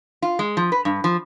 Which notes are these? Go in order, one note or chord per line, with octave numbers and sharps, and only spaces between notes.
F4
G#3
F3
B4
G2
F3